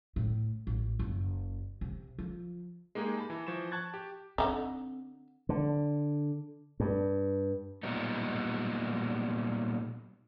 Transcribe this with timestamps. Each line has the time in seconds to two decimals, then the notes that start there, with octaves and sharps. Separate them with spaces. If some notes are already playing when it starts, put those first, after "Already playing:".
0.16 A2
0.67 A1
0.99 F#1
1.81 C3
2.19 F3
2.95 G#3 A#3 D#4 G4 G#4
3.18 A5 B5
3.30 E3
3.47 E3 F3 C#6 E7
3.72 A5 C#6 F#6 G#6 A6
3.94 G4
4.38 D3 D#3 C4 D#4
5.49 D3
6.80 G2
7.83 A#2 F#3 G3 B3 D#4